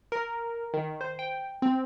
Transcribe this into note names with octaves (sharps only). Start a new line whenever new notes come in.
A#4
D#3
C5
G5
C4